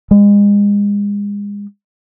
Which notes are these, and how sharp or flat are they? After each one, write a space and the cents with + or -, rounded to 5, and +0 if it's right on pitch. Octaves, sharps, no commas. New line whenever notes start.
G#3 -35